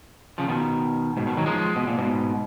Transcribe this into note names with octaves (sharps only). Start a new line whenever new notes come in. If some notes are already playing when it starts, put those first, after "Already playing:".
C#3 F3
B2 D#3
G#2 B2
B2 D#3
D#3 F#3
F3 G#3
B2
A#2
G#2 B2